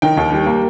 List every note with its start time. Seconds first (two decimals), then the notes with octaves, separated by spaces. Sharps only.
0.02 D#3 G5
0.17 D#2
0.32 G3
0.46 A#3